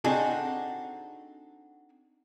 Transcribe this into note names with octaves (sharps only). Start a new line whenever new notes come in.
C4 D4 D#4 F#4 G#4 A4